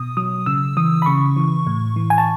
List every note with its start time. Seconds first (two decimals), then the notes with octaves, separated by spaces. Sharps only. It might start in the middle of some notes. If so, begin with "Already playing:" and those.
Already playing: B2 D#6
0.17 F#3 D#6
0.46 C#3 E6
0.77 E3 D#6
1.02 B5
1.06 C#3 C#6
1.36 E3
1.67 A2
1.96 E3
2.10 G#5
2.18 A5